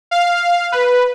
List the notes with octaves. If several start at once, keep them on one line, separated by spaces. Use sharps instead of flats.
F5
B4